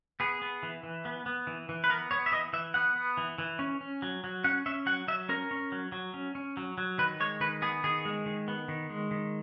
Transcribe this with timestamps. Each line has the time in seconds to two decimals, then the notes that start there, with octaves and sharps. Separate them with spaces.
0.20 B3 G#4
0.42 B3
0.63 E3
0.83 E3
1.05 B3
1.26 B3
1.47 E3
1.69 E3
1.84 B4
1.89 B3 A#4
2.11 B3 C#5
2.26 E5
2.32 E3 D#5
2.53 E3 E5
2.74 B3 F#5
2.96 B3
3.17 E3
3.38 E3
3.59 C#4
3.81 C#4
4.02 F#3
4.24 F#3
4.44 C#4 F#5
4.66 C#4 E5
4.86 F#3 F#5
5.08 F#3 E5
5.29 C#4 A#4
5.51 C#4
5.72 F#3
5.92 F#3
6.14 C#4
6.35 C#4
6.57 F#3
6.78 F#3
6.98 D#3 B4
7.20 G#3 C#5
7.41 D#3 B4
7.62 B3 G#4
7.84 D#3 G#4
8.05 G#3
8.26 D#3
8.48 B3
8.68 D#3
8.90 G#3
9.11 D#3